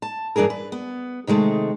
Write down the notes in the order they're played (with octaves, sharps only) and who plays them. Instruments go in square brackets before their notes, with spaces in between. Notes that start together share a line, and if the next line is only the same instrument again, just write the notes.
[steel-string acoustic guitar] A5
G2 E3 D4 G#4 A#4
B4
B3
C3 D#3 G#3 A3